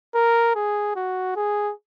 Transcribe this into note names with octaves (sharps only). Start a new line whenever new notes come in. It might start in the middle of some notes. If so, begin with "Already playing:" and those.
A#4
G#4
F#4
G#4